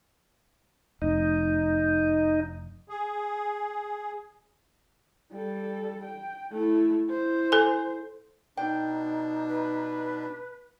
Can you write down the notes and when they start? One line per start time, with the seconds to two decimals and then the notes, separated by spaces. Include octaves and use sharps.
1.02 F1 D#4
2.89 G#4
5.32 G3 A4
6.04 G5
6.52 A3 E4
7.07 E4 C5
7.52 A4 G#5
8.57 B2 D4 D#4 G5
9.48 B4